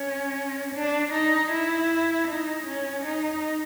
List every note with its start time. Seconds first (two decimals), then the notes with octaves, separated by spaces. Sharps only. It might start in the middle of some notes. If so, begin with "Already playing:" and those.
Already playing: C#4
0.75 D4
1.13 D#4
1.51 E4
2.28 D#4
2.67 C#4
3.05 D#4